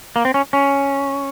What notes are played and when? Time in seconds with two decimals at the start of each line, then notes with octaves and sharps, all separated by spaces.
0.16 A#3
0.25 C4
0.34 C#4
0.53 C#4